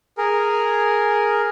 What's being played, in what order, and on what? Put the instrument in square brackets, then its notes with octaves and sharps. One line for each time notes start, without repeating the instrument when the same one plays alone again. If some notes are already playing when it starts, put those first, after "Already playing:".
[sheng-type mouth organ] G#4 A#4